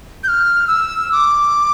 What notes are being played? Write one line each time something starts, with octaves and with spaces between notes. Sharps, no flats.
G6
F6
E6
D6